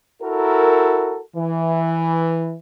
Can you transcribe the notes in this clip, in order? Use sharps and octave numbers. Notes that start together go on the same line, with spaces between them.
E4 F#4 A4 A#4
E3